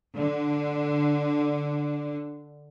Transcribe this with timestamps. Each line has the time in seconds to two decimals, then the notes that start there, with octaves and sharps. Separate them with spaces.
0.16 D3 D4